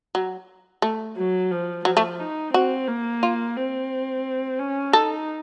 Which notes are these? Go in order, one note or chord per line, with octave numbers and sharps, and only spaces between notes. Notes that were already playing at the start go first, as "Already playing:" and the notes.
F#3
A3
F#3
F3
F3 F#3
A3
D#4
C4 F#4
A#3
F4
C4
C#4
D#4 A4